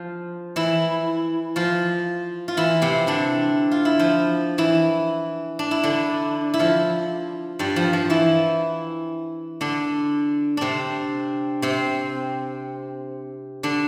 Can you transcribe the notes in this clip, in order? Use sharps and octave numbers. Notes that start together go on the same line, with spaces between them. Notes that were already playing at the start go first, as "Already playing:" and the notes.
Already playing: F3 F4
E3 E4
F3 F4
F4
E3 E4
C3 C4
D3 D4
F4
E4
F3 F4
E3 E4
D4
E4
D3 D4
E4
F3 F4
G2 G3
F3
F3
E3 E4
D3 D4
C3 C4 D4
C3 C4
D3 D4